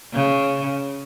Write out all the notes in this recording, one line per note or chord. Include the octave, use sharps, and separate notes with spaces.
C#3